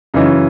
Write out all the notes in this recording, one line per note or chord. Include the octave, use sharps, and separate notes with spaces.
F#2 C#3 E3 D#4